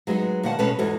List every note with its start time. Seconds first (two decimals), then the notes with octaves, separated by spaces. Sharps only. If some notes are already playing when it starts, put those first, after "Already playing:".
0.07 F#3 G#3 B3 C4 D#4
0.43 A#2 D#3 F#5 A5
0.59 B2 G#3 C#4 A4 B4 A5
0.79 E2 G#2 E3 B3 F#4 A4